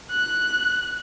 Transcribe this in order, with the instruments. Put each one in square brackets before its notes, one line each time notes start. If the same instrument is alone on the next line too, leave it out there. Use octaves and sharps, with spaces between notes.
[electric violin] F#6